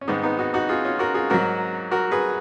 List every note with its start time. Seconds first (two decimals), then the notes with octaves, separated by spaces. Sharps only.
0.01 C#4
0.07 G#2 D#3 G#3 B3 D#4
0.23 B3 D#4
0.38 D#4 F#4
0.54 D#4 F#4
0.69 F4 G#4
0.85 C#4 F4
0.99 F#4 A#4
1.14 F4 G#4
1.30 G#2 F#3 F#4 A#4
1.91 F#4 A#4
2.11 G#4 B4